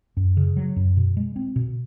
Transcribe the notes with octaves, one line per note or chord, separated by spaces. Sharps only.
F#2
C#3
F#3
F#2
B2
G#3
C4
B2